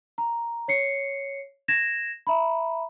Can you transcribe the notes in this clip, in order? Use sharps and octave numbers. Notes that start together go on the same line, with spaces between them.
A#5
C#5 C7 C#7
G#6 A#6 E7
E5 A#5 B5